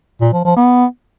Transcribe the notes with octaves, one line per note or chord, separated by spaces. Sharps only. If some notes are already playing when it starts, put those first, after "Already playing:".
A#2
F3
F3
B3